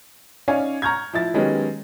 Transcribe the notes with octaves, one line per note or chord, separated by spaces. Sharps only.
C#4 D#4 C#5 D5 F5 G#5
A#5 C#6 F6 G6 G#6
F3 E4 A6
D#3 F#3 G#3 B3 C#4 G4